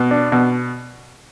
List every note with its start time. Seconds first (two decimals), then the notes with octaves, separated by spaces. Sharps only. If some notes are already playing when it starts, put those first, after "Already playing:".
Already playing: B2
0.11 D4
0.32 B2